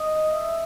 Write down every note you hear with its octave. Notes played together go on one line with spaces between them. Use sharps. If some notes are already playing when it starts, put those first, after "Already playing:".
Already playing: D#5
E5